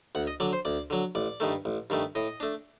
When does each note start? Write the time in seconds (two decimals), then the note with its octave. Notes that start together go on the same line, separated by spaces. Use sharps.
0.15 D2 F#5
0.27 D#5
0.40 D3 F#3 D5
0.53 C5
0.65 D2 D5
0.90 D3 F#3
1.15 A1 D5
1.40 G2 D#3 A3
1.65 A1
1.90 G2 D#3 A3
2.15 A2 D#5
2.40 A3 D4